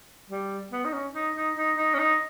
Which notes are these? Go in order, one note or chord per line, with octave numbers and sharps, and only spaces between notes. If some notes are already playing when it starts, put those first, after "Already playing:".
G3
B3
D#4
C#4
D#4
D#4
D#4
D#4
C#4
D#4